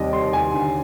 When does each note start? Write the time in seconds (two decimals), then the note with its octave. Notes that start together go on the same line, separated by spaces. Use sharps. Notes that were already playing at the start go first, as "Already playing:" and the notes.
Already playing: D#2 C3 G3 D5 D#5
0.13 G3 C6
0.33 D#2 G#5
0.54 D3